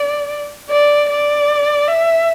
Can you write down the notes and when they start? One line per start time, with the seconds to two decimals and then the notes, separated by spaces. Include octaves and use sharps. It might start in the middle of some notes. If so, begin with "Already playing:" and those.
Already playing: D5
0.70 D5
1.09 D5
1.88 E5